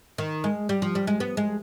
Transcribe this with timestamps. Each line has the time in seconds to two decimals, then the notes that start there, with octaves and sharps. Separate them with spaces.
0.18 D#3
0.44 G#3
0.69 G3
0.82 F3
0.95 G3
1.07 G#3
1.20 B3
1.37 G#3